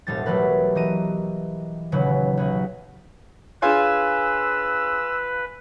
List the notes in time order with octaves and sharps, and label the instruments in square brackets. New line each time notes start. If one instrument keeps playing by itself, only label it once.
[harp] E1 A1 G3 A6
F#3 G3 A3 G4 A#4 B4
E3 G4 D#5 A#5 D#7
D#1 C#3 F#3 B4
B1 F#4 G#4 B4
[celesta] D4 G#4 C#5 [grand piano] F4 G#5 C6 [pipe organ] B4 [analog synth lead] E6